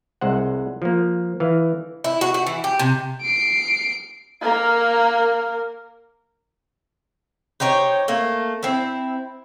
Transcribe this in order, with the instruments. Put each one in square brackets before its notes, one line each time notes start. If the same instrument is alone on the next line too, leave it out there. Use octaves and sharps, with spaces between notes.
[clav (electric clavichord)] C2 G#3 C5 F#5
F3 A#3
E3 F5
[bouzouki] E4
F#4
F#4
E3
G4
C3
[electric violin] C7 D7
[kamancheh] A#3 A#4
[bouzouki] D#4 G4 C5 C#5
A3 A#3
C4 E4